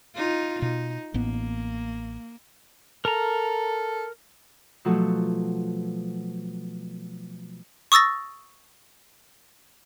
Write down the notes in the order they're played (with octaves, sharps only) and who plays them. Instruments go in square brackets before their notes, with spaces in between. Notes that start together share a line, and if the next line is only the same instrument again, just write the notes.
[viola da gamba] D#4 F4
[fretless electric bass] B2 [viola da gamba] D#4
[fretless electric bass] A1 A2 B3 [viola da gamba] A#3
[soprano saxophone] A4 [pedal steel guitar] A#4 A#5
[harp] B2 F3 F#3 A3 F#4 A4
[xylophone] C#6 D#6 E6 A6 A#6